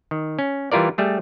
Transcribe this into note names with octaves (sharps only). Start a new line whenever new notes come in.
D#3
C#4
E3 G3 E4 F4 A#4 D5
G3 A3 G#4